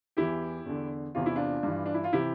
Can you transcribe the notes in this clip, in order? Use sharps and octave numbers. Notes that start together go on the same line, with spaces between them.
E2 E3 E4 G4
E2 D3
E2 C3 E3 F4
E4
D4 F4
G2 E3
D4
E4
F4
C3 E3 E4 G4